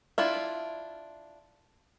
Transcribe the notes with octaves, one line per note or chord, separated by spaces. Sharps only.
D4 E4 F4 E5